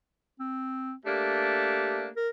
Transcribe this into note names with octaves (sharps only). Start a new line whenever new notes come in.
C4
A3 A#3 D4 G4
A#4